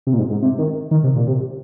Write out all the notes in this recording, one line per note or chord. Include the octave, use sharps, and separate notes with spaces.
C3
A#2
G#2
G#2
C3
D#3
D#3
C3
A#2
C3